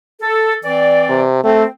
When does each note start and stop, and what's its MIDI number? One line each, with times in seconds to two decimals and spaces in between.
0.22 0.56 69
0.65 1.23 52
0.65 1.23 60
0.65 1.23 74
1.10 1.44 48
1.44 1.63 57
1.44 1.66 60